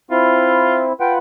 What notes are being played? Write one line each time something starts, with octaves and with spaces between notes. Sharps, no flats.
C4 E4 F4
F4 B4 F#5 G5